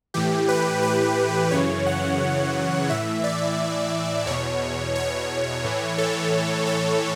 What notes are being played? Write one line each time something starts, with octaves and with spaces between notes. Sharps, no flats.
A2 E3 G4
B4
B4
F#2 C#3 E3 C#5
F#5
A2 E3 E5
D5
E2 B2 C#5
C#5
A2 E3
A4
A4